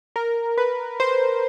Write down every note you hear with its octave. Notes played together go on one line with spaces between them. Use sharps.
A#4
B4
C5